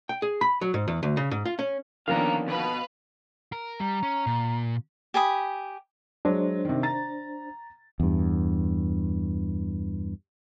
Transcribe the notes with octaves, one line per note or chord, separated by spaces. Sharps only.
G5
G#4
B5
F#3
G#2
E2
D2
C#3
G#2
F4
C#4
D3 D#3 F3 A#3 B3 C#4 F5 A#5
E2 B2 B4 F5 B5
A#4
G3 A#5
C#4
A#2
G4 G#5 B5 D#6
F#3 G#3 D4 C5
C3 D#3
A#5 A6
E2 G2